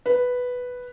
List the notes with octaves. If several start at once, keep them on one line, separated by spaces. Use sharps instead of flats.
B4